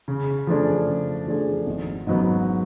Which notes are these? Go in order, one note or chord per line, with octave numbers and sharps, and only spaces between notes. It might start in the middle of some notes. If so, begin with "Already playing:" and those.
C#3
F3 A3 D4 G#4
C#3
F3 A3 D4 G#4
G#1
G#2 F#3 B3